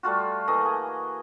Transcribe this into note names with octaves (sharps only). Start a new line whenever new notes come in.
G3 A3 F4 F#4
E3 A3 A#3 D#5
G#4